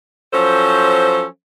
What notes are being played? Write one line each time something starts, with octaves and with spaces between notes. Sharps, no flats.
F3 F#3 C#4 A4 C5